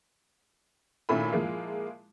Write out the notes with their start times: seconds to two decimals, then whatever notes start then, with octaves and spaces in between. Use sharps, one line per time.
1.09 A#2 D#3 A3 C#4 E4 B5
1.30 F3 G#3 A#3 E4 F5